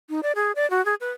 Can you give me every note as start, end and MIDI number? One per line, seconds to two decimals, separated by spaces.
0.10 0.20 63
0.23 0.32 74
0.35 0.52 68
0.56 0.69 74
0.70 0.83 66
0.85 0.95 68
1.01 1.11 71